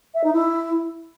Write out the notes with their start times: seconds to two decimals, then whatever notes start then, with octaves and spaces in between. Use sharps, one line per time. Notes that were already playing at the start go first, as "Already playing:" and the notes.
0.14 E5
0.24 D#4
0.33 E4